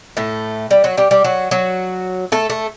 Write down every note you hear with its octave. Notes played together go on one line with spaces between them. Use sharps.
A2 A3
G3
F#3 F#4
G3 G4
G3 G4
F#3 F#4
F#3 F#4
A3 A4
A3 A4